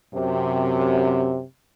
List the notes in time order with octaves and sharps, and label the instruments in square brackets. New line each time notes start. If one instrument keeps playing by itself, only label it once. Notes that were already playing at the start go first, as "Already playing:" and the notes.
[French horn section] F#2 C3